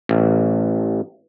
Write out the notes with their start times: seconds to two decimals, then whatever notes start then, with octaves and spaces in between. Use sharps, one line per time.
0.09 A1